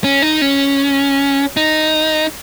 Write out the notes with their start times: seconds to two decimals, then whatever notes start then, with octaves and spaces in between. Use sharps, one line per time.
0.04 C#4
0.22 D#4
0.42 C#4
1.57 D#4